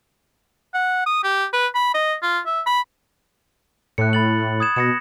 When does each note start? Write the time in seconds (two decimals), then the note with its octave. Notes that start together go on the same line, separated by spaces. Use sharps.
0.74 F#5
1.07 D#6
1.24 G4
1.53 B4
1.75 B5
1.94 D#5
2.23 F4
2.46 E5
2.66 B5
3.98 A2 F#6 C#7
4.13 B5 A6 F#7
4.60 D#6 G#6 E7
4.76 B2 A#6 C#7 E7